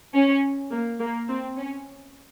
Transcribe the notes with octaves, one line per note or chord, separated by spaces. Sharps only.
C#4
A#3
A#3
C4
C#4